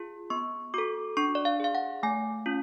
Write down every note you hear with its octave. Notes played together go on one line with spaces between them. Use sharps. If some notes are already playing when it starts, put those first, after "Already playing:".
Already playing: F4 G#4
B3 C#6
F#4 A4 D6
D4 C#6
D5
F5
G#4 F5
F#5
A3 G#5
C#4 F4